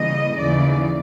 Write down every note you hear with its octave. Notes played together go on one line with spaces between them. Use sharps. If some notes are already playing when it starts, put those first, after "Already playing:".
Already playing: C#3 E3 G3 A#3 D#5
D#2 C#3 E3 D5